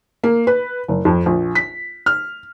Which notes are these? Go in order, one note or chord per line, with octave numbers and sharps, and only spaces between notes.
A#3
B4
F#1
F2
A#1
B6
F6